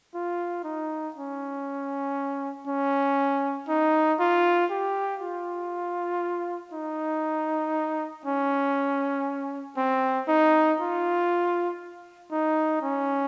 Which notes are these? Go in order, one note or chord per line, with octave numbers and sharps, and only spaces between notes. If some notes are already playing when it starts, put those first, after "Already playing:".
F4
D#4
C#4
C#4
D#4
F4
G4
F4
D#4
C#4
C4
D#4
F4
D#4
C#4